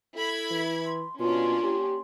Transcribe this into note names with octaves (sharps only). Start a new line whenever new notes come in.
E4 A4 B5 G#6
E3
C6
B2 A#3 C#4 D4 F4 C6
G4